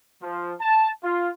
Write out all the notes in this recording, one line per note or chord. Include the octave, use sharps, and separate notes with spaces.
F3
A5
F4